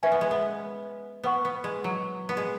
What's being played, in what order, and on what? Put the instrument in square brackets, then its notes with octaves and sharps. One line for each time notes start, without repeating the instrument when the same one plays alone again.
[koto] C#4 [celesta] B4 E5 G#5
[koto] B3
G#3
B3
[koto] B3 [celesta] B4 F#5 C#6
[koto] B3
G#3
F#3
B3
G#3